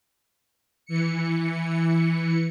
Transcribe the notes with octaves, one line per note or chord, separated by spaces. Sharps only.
E3 C#7